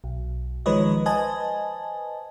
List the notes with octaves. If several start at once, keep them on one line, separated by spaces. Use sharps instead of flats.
B1
D#3 F3 G#3 B4 C#5 D#5
B4 C5 D#5 G#5 A5